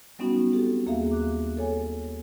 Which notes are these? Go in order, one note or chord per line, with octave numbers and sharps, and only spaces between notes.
F#3 G3 B3 C#4 D#4 F#4
C4 G4 A4
D#2 A#3 G#4 E5 F5
D6 F#6
A4 C#5 G#5